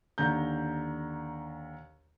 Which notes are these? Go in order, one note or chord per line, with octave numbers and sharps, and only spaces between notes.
D#2 D3 A#5 G6